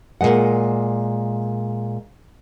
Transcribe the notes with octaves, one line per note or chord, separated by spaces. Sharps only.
A#2 F#3 G#3 F#5